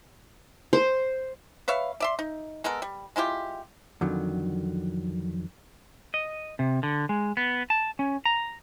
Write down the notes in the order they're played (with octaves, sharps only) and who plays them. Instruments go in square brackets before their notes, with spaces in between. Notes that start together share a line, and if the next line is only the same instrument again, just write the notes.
[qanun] C5
[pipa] B4 C#5 E5 F5
D5 E5 C6
D#4
G#3 B3 A4 A#4
G3
G#3 E4 F4 G4
[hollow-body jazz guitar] F2 D3 D#3 F#3
[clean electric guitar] D#5
C3
D3
G#3
B3
A5
C#4
A#5